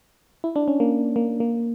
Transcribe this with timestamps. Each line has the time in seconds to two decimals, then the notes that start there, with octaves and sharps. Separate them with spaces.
0.44 E4
0.56 D4
0.68 C#4
0.80 A#3
1.16 A#3
1.40 A#3